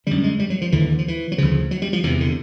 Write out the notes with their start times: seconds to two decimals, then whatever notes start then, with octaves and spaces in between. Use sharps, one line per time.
0.07 F#2 D3 G3
0.23 G#3
0.39 G3
0.50 F#3
0.61 F3
0.72 D#2 D3 E3
0.89 E3
0.98 F3
1.08 E3
1.32 F#3
1.38 D2 C#3 F3
1.71 F#3
1.82 G3
1.93 F3
2.04 E2 C3 E3
2.21 D3